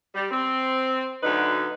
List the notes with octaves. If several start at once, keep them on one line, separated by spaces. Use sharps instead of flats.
G3
C4
D2 D3 F#3 D#4 B4